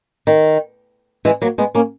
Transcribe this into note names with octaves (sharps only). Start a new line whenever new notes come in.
D#3
E3 G#3
F#3 A#3
G#3 B3
A#3 C#4